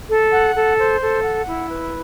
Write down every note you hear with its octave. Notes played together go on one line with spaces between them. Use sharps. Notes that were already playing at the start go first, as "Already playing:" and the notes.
A4
F#5
A4
C5
A4
F#5
E4
B4